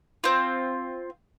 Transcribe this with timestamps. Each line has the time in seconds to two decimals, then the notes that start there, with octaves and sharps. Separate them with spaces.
0.24 C4 F4